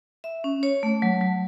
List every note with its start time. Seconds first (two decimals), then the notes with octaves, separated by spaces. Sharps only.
0.24 E5
0.44 C#4
0.63 C#5
0.83 A3
1.02 F#3
1.21 F#3